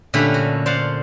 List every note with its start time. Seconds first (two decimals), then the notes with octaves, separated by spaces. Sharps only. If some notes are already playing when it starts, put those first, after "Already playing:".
0.14 A#2 D3 A3 C#4 G4 B4
0.34 F#4
0.66 C5 D5 F5 F#5